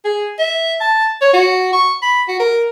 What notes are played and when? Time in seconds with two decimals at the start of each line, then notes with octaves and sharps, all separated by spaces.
0.05 G#4
0.39 E5
0.80 A5
1.21 C#5
1.33 F#4
1.73 C#6
2.02 B5
2.28 F#4
2.40 A#4